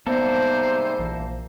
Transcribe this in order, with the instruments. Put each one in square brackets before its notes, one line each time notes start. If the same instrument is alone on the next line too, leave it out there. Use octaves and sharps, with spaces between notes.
[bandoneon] G#2 C3 G3 [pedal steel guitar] A#3 A4 [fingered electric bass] B3 [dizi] C5
[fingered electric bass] A#1 E3